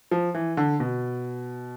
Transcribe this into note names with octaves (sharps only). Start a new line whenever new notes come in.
F3
E3
D3
B2